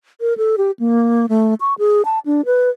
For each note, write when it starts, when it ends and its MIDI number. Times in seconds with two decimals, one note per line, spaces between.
0.21 0.37 70
0.37 0.56 69
0.58 0.71 67
0.79 1.26 58
1.29 1.54 57
1.61 1.74 85
1.79 2.02 68
2.05 2.19 81
2.26 2.45 62
2.45 2.70 71